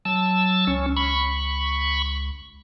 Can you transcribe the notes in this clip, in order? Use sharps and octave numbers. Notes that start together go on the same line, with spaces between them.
F#3 A5 E6
C#2 C#4
B5 C#6